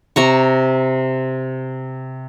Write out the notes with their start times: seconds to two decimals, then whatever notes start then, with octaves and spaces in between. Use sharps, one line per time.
0.16 C3 A#5 C#6